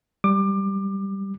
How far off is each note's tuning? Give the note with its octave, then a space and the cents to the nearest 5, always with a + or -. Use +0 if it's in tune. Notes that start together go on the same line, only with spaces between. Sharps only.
G3 +0 D6 +25